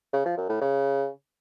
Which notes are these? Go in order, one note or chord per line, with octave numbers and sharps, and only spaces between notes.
C#3
F3
F#2
A2
C#3